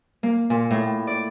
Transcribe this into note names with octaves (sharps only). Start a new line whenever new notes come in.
A#3
A#2
A2
D5